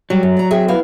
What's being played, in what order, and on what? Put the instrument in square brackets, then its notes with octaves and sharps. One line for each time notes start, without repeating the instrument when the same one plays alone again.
[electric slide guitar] F#3 [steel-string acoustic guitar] G3
[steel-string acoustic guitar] F#2
D5 A#5
C4 G#4 E5
B3 E4 F5